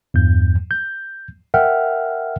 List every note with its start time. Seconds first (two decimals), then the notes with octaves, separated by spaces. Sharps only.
0.14 E2 G2 G6
0.71 G6
1.54 A#4 E5 F#5 G5 F6